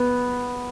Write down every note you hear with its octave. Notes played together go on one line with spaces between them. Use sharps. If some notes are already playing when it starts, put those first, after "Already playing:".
Already playing: B3